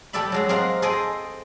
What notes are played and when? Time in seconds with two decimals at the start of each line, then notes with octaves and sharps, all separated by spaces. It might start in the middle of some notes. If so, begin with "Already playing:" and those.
0.13 G3 G4 A4 D5 E5 B5
0.32 F#3 G#3 G#4
0.49 C4 G#4 A#4 F5 F#5
0.82 G#4 A4 C5 D#5 G5 G#5